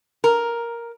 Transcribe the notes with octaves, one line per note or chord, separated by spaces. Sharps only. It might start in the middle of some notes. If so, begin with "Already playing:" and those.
A#4